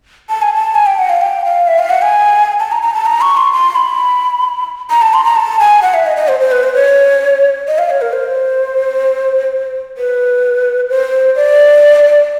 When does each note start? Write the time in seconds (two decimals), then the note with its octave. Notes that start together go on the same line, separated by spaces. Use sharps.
0.29 A5
0.42 G#5
0.54 A5
0.75 G#5
0.86 G5
0.99 F#5
1.09 F5
1.21 G5
1.45 F5
1.67 E5
1.79 F5
1.90 F#5
2.02 G#5
2.60 A5
2.72 A#5
2.83 A#5
2.94 A5
3.06 A#5
3.21 C#6
3.37 C6
3.53 C6
3.76 B5
4.90 A#5
5.02 A5
5.14 C6
5.24 A#5
5.36 A5
5.59 G#5
5.82 F#5
5.94 E5
6.06 D#5
6.17 D#5
6.28 C5
6.40 C5
6.52 B4
6.63 C5
6.74 C#5
7.68 D#5
7.78 F5
7.90 C#5
8.01 A#4
8.13 C5
9.98 B4
10.89 C5
11.36 D5